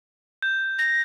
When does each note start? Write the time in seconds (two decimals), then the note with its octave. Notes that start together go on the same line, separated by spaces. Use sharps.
0.42 G6
0.79 A#6